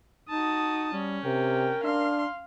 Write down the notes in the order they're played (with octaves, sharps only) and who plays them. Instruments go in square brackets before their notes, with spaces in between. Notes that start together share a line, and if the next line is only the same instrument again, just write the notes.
[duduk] D#4 [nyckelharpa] F#4 A5 [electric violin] D#6
[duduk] G3 [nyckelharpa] C#4
[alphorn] C3 [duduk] A#4 [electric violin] G5
[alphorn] D4 [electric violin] F5 [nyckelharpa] C6